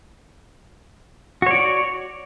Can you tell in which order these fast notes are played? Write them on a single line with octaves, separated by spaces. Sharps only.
F#4 C#5 D5